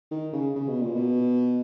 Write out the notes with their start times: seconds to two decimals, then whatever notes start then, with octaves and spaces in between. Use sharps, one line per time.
0.11 D#3
0.33 C#3
0.56 C#3
0.68 B2
0.82 A#2
0.94 B2